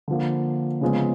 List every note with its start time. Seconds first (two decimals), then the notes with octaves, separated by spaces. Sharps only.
0.08 D3 F3 A#3
0.81 C#3 F3 G#3 B3